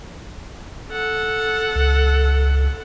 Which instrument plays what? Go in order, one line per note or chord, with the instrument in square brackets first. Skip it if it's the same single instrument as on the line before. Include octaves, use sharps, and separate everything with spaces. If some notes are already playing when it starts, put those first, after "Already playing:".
[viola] A4 F#5
[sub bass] C#2